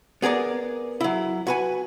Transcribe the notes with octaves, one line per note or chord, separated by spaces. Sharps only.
B3 G#4 A#4 D5
F#3 E4
F#4 B4 G#5